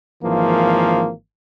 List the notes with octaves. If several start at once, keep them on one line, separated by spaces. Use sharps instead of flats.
G#1 E3 F3 A#3